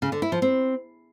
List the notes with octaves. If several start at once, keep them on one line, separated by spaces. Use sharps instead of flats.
C#3
D3
E4
F3
C4